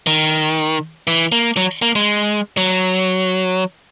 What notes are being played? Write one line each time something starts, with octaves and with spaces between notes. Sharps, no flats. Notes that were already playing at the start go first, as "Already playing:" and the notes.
D#3
E3
A#3
F#3
A#3
G#3
F#3